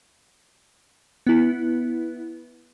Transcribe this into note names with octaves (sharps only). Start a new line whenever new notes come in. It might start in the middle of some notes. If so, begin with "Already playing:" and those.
B3 E4